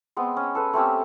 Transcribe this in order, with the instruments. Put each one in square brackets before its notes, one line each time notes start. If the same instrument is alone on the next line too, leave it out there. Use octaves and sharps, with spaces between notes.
[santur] G#3 B3 C4
C#4
A4 B4
A3 C4 C#4 G4